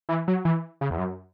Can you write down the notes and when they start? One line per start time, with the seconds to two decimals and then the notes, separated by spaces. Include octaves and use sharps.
0.09 E3
0.28 F#3
0.45 E3
0.81 C#3
0.90 E2
0.98 F#2